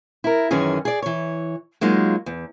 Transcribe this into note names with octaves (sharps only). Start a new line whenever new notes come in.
E4 A#4
F#2 D#3 E3 C#4 G#4
G#4 D5
E3 C#5
F#3 G#3 A#3 D#4 F4
E2